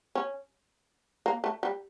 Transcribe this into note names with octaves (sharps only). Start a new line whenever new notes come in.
C#4
A#3
A3
G3